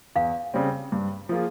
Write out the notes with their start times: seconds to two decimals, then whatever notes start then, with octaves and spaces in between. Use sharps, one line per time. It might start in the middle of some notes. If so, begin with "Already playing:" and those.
0.16 E2 F5
0.54 C#3 G3 C4
0.92 G2
1.29 F3 A#3 F4 G#4